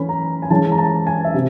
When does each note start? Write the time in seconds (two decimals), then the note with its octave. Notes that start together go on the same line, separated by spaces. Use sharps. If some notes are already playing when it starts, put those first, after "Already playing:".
Already playing: E3 A3 C#4 B5
0.09 A#5
0.42 G#5
0.50 E3 G#3 C#4 A5
0.72 A#5
0.78 A5
1.07 G#5
1.24 E5
1.34 C3